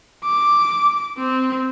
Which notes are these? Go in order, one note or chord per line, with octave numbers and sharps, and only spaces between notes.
D6
C4